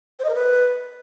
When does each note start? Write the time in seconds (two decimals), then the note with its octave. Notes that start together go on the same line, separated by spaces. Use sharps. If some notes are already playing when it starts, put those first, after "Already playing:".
0.19 C5
0.24 D#5
0.29 A#4
0.34 B4